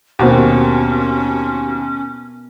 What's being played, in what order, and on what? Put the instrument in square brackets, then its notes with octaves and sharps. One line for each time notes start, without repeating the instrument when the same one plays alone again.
[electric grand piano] D#2 [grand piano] B2 A#3 [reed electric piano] C4 F#4 G4 [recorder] C#4